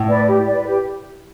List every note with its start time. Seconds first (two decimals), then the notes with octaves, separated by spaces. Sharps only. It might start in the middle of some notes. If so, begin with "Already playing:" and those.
Already playing: A2
0.08 B4 D5
0.27 G4
0.47 B4 D5
0.66 G4